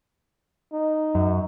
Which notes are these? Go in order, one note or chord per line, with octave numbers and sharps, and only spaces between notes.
D#4
F#2